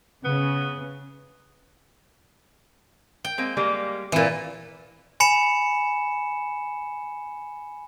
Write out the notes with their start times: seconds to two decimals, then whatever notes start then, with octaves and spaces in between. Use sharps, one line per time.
0.25 C#3 B3
3.25 G5
3.38 G#3 A#3 C4
3.57 G3 G#3 A#3
4.12 A#2 E3 C4 E4
5.20 G#5 B5 C#7 E7